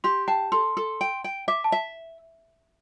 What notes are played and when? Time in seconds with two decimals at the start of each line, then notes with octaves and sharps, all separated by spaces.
0.04 G4 C6
0.28 G5 A5
0.52 A4 C6
0.77 A4
1.01 G5
1.24 G5
1.48 E5 D6
1.64 A5
1.72 E5